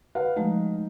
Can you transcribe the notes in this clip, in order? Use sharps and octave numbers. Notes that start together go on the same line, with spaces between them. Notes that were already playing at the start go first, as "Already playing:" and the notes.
B4 F5 F#5
F3 G#3 A3 D#4